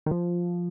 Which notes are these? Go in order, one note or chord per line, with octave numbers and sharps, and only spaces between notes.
D#3
F3